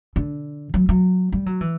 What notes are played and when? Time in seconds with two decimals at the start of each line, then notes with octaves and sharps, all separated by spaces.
0.16 D3
0.74 F#3
0.89 F#3
1.33 G3
1.46 F#3
1.61 E3